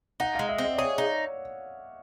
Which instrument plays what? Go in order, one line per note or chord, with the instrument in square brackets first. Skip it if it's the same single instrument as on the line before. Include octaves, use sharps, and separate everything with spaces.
[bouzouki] D#4 [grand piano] F#5
[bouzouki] G#3 [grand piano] F5
[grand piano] E5
[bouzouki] C4
[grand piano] D#5
D5
[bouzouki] G#4 [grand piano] C#5
[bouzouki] D#4